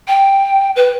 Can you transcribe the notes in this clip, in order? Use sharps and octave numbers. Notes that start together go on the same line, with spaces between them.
G5
B4